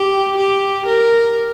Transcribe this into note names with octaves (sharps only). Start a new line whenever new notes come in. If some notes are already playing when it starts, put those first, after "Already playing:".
Already playing: G4
G4
A#4